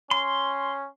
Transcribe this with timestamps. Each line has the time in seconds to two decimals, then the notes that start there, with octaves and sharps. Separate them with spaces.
0.11 C#4 C6